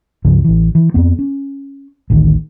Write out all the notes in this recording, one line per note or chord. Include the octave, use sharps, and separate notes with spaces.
C#2 G2 C#3 F3
A1 E3
E3
F2 B3 C4
C#4
A1 D2 D#3